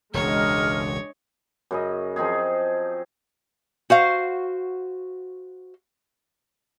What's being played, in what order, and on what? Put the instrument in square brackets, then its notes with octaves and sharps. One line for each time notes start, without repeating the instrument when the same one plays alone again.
[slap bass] E1 C#2 [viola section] G#3 D4 D#5 [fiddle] C#5 [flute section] A#5 F6
[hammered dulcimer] F#2 C#3 D#5
F3 C4 D#4 G#4
[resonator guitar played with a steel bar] F#4 C5 F5